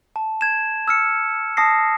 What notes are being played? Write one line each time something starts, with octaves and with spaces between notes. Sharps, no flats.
A5
G#6 E7
E6 F6 C#7
A5 D#6 A#6 C7